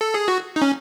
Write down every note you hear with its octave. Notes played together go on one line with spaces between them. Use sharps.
A4
G#4
F#4
D#4
C#4